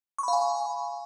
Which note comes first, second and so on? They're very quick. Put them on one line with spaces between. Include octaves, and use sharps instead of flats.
C#6 B5 F5 G#5